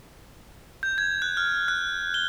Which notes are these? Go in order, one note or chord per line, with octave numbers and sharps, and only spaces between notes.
G6
G#6
F#6
F6
F#6
G7